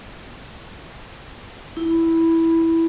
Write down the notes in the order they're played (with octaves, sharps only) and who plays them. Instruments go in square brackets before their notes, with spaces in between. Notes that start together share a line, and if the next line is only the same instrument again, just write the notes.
[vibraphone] E4